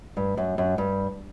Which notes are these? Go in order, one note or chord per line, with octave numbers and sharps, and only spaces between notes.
G2
F#2
F#2
G2